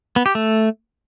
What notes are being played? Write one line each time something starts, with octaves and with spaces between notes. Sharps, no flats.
B3
G4
A3